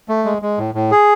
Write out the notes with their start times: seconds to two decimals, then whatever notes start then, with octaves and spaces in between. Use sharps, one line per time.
0.09 A3
0.25 G#3
0.42 G#3
0.58 A2
0.75 A2
0.91 G#4